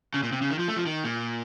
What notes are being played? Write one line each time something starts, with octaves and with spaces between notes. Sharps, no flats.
C#3
A#2
C3
C#3
D#3
F3
A3
F3
D#3
A#2